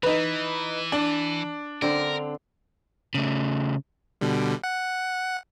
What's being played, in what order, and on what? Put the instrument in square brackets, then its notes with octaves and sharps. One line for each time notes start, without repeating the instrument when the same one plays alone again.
[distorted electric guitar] E3 [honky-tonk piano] D#4 B4
[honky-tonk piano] D4
[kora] D3 C4 [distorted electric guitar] A#4
[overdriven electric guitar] C#3 A3
[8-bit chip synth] B2 D3 G3
F#5